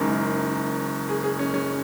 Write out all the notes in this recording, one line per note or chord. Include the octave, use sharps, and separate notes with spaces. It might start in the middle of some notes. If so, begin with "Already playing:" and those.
Already playing: F#1 F#2 D#3 G#3
G#4
G#4
C#4
C#4